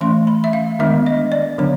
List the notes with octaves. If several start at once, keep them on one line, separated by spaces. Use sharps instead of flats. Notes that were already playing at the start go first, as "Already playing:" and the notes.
E3 A3 C#4 C6
B5
E5
F5
D#3 G#3 B3 D4 E5
D#5
D5
D3 F#3 B3 D4 C#5